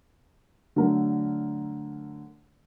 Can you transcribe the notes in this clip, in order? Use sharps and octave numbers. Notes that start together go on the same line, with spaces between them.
D3 F#3 A3 D4 A#4